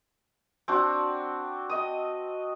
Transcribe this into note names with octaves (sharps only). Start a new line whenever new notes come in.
C4 D4 F#4
D#5 D#6